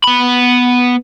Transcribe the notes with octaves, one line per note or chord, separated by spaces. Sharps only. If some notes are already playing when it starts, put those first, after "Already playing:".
B3 B5